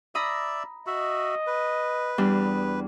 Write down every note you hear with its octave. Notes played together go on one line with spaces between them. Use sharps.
D5 E5 A#5 B5 D#6
F#4 D#5 E5
B4
E2 G3 D4